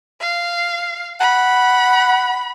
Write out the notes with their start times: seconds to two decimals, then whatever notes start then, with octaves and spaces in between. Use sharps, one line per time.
0.21 F5
1.20 F#5 B5